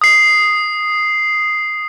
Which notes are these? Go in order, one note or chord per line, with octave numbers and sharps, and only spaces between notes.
D#6 C7